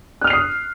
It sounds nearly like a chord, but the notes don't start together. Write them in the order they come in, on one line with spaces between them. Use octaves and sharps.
F#6 F6 F7 C7 D#6